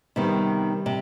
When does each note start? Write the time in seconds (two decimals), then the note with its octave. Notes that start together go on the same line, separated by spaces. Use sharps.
0.16 C3 D#3 G3 B3
0.86 C3